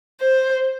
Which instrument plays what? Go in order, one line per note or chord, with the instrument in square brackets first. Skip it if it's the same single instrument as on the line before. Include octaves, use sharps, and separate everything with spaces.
[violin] C5